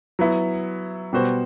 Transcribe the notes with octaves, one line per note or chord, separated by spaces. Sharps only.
F#3 B3 E4
B2 G3 B3 F#4 C5